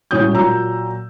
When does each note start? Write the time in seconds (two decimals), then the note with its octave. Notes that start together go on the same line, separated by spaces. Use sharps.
0.11 A2 G3 C#4 F#4 D#6 G6
0.33 A#2 F#3 A#5 E6